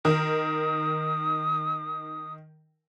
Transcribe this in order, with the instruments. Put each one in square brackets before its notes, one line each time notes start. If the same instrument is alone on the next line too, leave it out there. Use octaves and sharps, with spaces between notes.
[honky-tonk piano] D#3 A#4 [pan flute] D#6